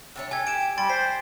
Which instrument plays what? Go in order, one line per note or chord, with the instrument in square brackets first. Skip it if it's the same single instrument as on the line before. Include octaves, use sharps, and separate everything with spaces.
[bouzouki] C3 D4 C#5
[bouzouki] G4 A4 [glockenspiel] G#5 G#6
[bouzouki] G4 [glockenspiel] D7 E7
[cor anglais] G3 [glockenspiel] C6 A6 D7
[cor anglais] C5 [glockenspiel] B6